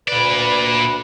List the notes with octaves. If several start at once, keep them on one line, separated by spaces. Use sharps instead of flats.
D2 A#2 B4 D5